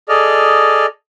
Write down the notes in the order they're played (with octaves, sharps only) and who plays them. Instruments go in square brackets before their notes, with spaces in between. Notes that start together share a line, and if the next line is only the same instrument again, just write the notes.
[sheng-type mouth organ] G#4 A4 D5 D#5 F6